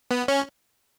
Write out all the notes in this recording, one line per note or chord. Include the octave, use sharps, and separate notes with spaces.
B3
C#4